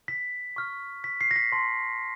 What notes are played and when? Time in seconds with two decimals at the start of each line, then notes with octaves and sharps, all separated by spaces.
0.08 B6
0.56 C#6 F6
1.04 B6
1.21 C7
1.31 A#6
1.36 B6
1.52 A5 C6 F6